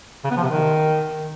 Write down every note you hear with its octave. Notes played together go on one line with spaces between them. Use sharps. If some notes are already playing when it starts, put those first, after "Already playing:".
C#3
B3
F3
C3
D#3